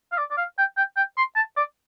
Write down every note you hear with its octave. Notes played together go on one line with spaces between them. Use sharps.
F5
D5
D5
F5
G5
G5
G5
C6
A5
D5